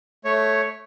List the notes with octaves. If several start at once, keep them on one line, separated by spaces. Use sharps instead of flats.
A3 C#5